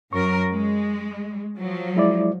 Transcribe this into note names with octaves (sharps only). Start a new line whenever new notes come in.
F#2 A#4 C#6
G#3
F3 F#3
G#3 E4 D5